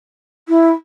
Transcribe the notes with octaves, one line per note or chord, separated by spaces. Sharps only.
E4